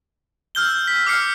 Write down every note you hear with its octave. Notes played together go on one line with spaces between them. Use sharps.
E6 F6 G6 G7
B6
D6 F6 C7 C#7